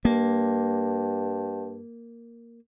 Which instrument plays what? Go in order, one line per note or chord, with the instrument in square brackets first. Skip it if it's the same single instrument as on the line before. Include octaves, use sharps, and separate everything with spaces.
[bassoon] G2 [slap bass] A#3